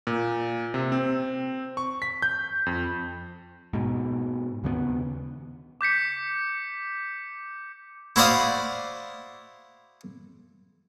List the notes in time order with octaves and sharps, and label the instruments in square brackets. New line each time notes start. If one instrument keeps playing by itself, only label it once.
[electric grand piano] A#2
C3
C4
C#6
B6
G6
F2
[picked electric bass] G#2 B2
D#2 C#3 A3 B3
[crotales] D6 G6 B6 C#7
[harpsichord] E4 F#4 C5 D5 F5 D#6